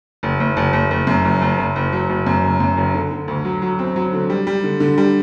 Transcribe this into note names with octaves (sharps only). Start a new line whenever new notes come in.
F#1
F#1
F#1
F#1
F#1
F#2
F#1
F#1
F#1
F#1
F#3
F#1
F#2
F#1
F#2
F#1
D3
D3
D2
F#3
F#3
C4
F#3
D3
G3
G3
D3
D3
G3